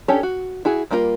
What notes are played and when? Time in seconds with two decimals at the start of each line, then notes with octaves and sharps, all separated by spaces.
0.08 C#4 D4 G4 A4 C#5
0.23 F#4
0.65 E4 F#4 G#4
0.91 G3 A#3 D4 F4 A#4